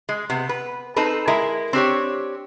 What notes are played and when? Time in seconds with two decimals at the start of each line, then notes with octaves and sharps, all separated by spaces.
0.09 G#3
0.30 C3 B3
0.49 B4
0.96 C4 D#4 A4 B4
1.27 G#3 E4 A#4
1.73 C4 D4 G4 C#5